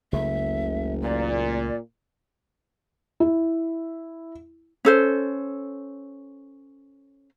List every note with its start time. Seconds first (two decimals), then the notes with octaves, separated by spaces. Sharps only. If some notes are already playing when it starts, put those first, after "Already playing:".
0.13 F#1 C#2 C#3 A3 E5
1.03 A#2 D5
3.20 E4
4.85 C#4 A4 C5